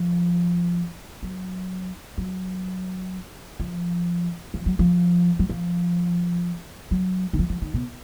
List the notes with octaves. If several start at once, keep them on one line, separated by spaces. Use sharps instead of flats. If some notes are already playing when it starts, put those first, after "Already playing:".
Already playing: F3
F#3
F#3
F3
F3
F#3
F3
F#3
F3
F#3
D#3
F3
F3
D#3
B2